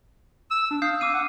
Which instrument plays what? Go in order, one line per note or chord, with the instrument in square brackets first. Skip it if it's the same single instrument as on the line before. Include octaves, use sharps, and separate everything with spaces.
[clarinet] E6
D4
[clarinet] F5 [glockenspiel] D#6 G6 C7
[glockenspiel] D6 E6 D#7
[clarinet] F#5